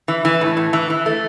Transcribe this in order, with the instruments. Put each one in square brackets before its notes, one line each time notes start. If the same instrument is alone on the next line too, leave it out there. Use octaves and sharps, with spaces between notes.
[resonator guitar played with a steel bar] E3
E3
A2
A2
E3
E3
A3